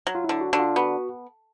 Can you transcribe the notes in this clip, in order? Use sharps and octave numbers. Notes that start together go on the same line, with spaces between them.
F#3
F4
D3 E4
F#4
D3 F#4
F4
B3 F#4